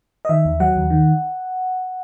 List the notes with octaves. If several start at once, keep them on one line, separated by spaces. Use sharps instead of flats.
D#5
D#3 E5
D#2
F#3 F#5
D#2
D#3